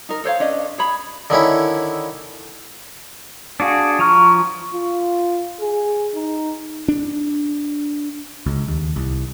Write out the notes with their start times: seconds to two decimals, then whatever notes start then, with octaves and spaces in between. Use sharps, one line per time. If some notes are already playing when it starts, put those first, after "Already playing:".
0.09 D#4 A#4
0.24 A4 C5 C#5 F5
0.40 C#4 D4 D#5
0.78 G#4 C#5 B5
1.30 D3 D#3 C#4 E4
3.60 D4 F#4 G#4 F5
3.99 F3 A#5 C#6 F6
4.74 F4
5.61 G#4
6.14 D#4
6.88 D4
8.46 C#2
8.68 D#2
8.96 C2